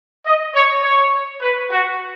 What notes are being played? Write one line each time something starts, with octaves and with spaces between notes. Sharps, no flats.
D#5
C#5
C#5
B4
F#4